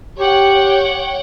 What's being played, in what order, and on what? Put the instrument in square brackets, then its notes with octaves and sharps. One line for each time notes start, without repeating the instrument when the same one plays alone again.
[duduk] G4 [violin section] C#5 F#5 G5